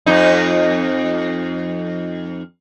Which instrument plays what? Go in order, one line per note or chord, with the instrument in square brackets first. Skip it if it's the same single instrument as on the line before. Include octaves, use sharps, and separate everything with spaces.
[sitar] F2 D#4